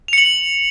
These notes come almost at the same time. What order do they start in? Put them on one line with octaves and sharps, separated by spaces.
F7 C#7 F#7